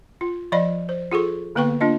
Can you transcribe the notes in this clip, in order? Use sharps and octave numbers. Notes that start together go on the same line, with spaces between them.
F4
F3 D5 D#5 F5 B5
C5
F4 G#4 A4 C#6
D3 A#3 B3 B4 G5 C#6
A#3 D4 F4 D#5